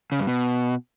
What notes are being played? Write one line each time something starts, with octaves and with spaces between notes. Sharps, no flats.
C#3
G2
B2